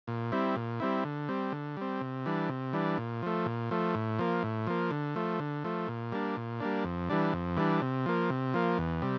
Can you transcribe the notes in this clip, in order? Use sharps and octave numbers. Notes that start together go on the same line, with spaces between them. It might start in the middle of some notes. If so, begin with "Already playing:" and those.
A#2
G3 C4 E4
A#2
G3 C4 E4
D3
G3 C4
D3
G3 C4
C3
E3 G3 D4
C3
E3 G3 D4
A#2
F3 A3
A#2
F3 A3
A2
F3 A#3
A2
F3 A#3
D3
F3 A3
D3
F3 A3
A#2
G3 A#3 D4
A#2
G3 A#3 D4
F2
E3 G3 D4
F2
E3 G3 D4
C3
F3 A#3
C3
F3 A#3
E2
C3 G3